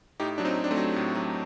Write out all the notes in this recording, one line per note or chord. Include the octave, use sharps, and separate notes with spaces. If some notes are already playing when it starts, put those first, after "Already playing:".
A2 D#4 G4
F#3 D4
C4 D#4
F#3
D4
A3 C4
F#3
A2
F#3